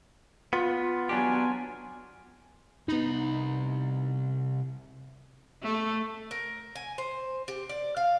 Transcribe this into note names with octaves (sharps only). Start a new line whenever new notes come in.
B3 F4
F#3 B3 D4 G4 G#5
C2 B3 D#4 B5
A3
A#4
G#5
C5
G4
D5
F5